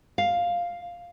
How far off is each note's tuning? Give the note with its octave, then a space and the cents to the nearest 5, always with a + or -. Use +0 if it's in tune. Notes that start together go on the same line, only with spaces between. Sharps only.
F5 +0